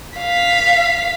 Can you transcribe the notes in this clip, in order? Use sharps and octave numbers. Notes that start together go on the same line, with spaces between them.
F5 B6